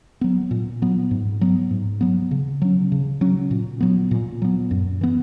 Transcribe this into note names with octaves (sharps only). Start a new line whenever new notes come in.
F#3 B3
A#2
F#3 B3
G#2
F#3 B3
G#2
F#3 B3
C#3
F#3 C#4
C#3
F#3 C#4
A#2
F#3 B3
A#2
F#3 B3
F#2
E3 B3